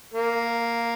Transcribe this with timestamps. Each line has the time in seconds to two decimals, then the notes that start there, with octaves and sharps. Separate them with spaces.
0.14 A#3